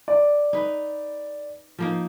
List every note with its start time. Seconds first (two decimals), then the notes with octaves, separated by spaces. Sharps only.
0.08 D5
0.53 D#4 B4
1.79 F3 A#3 D#4